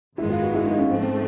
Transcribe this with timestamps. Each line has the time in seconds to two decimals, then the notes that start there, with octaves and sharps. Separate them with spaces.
0.18 G#1 F#2 D#3 G#3 B3 E4
0.30 F4
0.42 F#4
0.54 E4
0.66 D#4
0.78 C#4
0.89 G#2 F3 A3 C4
1.02 C4